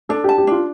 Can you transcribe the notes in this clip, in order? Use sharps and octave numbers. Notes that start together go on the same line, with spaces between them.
D4 A4
G4 A5
G4
D4 F4